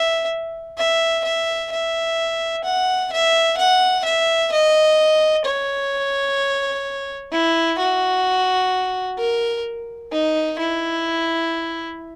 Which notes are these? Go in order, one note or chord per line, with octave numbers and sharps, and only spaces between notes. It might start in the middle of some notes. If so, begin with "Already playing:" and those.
Already playing: E5
E5
E5
E5
F#5
E5
F#5
E5
D#5
C#5
E4
F#4
A#4
D#4
E4